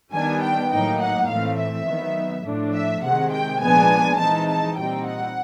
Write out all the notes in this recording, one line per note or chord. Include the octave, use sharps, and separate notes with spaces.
D#3 G3 B3 D4 G#5
G5
A2 F#3 A#3 D#4 G5
F#5
A2 E3 A3 C4 F5
E5
D#3 F#3 B3 D#4
A2 F3 A3 D4
E5
C3 D#3 G#3 F#5
G5
A#2 F3 G#3 B3 D4 G#5
E3 G#3 C4 D#4 A5
A5
A#2 G3 C4 D#4 G5
F#5